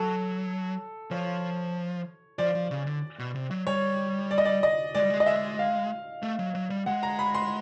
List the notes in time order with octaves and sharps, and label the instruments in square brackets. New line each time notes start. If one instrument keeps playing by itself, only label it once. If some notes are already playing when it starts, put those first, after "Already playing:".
Already playing: [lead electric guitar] F#3 [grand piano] A4
[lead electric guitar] F3 [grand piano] C#5
[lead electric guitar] F3 [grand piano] D5
[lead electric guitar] F3
C#3
D3
B2
C3
F#3
[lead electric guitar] G3 [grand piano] C#5
[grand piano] D5
D#5
D5
D#5
[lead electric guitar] G#3 [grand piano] D5
[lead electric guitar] G3
G#3
[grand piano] D#5
E5
F5
[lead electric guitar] A3
F#3
F#3
G3
[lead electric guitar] G#3 [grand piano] F#5
[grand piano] A#5
B5
C6